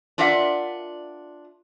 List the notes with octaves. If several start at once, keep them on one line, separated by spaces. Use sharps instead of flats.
D4 F4 A#4 D5 E5 F#5